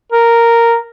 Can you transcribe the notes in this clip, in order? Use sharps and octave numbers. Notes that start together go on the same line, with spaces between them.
A#4